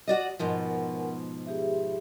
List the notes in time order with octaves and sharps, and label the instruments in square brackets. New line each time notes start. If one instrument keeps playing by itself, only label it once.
[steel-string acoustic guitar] F#4 D5 D#5
[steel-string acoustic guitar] G#2 B2 F3 [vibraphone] A#4 F#5 G#5
[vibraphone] G4 G#4 E5